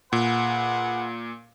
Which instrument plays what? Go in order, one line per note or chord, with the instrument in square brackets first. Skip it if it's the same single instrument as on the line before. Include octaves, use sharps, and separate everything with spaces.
[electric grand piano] A#2 [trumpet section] G#4 B4 F#5